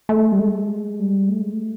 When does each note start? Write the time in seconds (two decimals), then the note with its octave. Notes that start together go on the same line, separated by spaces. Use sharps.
0.09 A3
0.32 G3
0.39 G#3
0.99 G3
1.29 A3
1.41 G#3
1.53 A3